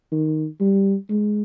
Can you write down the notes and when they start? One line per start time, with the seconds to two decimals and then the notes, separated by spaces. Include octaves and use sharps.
0.12 D#3
0.60 G3
1.10 G#3